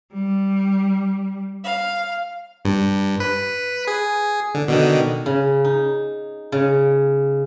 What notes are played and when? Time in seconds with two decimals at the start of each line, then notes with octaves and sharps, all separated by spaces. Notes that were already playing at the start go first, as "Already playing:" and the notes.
0.13 G3
1.64 F5
2.65 G2
3.20 B4
3.87 G#4
4.55 D3
4.68 B2 D3 D#3
5.26 C#3
5.65 D#4
6.52 C#3